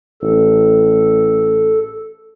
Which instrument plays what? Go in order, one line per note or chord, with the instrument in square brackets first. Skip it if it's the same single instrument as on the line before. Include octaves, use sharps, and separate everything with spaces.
[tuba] A1 [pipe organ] A4